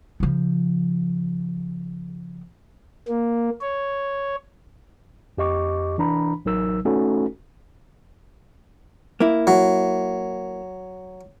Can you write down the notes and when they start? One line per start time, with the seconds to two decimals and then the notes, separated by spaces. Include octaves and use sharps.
0.20 C#3 F3
3.08 A#3
3.61 C#5
5.38 F2 G4 D#5 C#6 D6
5.98 E3 D4 A#5 B5
6.45 A1 F#3 D#4 A#4 E6
6.85 A3 C#4 D#4 F#4 A4
9.20 A#3 E4
9.47 F#3